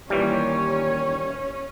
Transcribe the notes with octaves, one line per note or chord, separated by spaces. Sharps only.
D#2 A#2 E3 G3 C#4 C#5